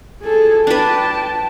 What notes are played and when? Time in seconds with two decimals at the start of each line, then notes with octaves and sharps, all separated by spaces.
0.23 G#4 A4
0.67 D4 B4 G5 A5